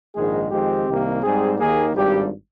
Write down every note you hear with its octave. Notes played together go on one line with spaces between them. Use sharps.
A#1 G#2 D#3 G#3 G#4
F2 D#3 G#3 C4 G4
C2 C3 D#3 A#3
G#2 G3 C4 G#4
D#2 D#3 A#3 G#4
G#1 G2 G3 G4